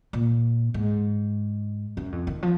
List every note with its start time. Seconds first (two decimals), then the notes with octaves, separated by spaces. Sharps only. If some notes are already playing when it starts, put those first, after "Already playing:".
0.13 A#2
0.74 G#2
1.97 F#2
2.12 F2
2.27 D#3
2.42 F3